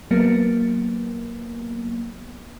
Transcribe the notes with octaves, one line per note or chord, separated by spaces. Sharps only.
F#3 A#3 B3